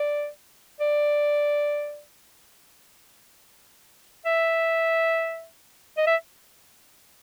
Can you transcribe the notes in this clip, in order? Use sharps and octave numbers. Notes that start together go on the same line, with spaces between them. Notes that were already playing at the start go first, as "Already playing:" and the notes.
Already playing: D5
D5
E5
D#5
E5